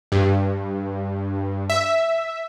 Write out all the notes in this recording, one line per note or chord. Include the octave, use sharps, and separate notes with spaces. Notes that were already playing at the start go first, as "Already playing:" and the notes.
G2
E5